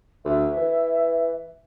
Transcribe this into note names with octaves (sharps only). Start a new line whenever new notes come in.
D2 E5
E3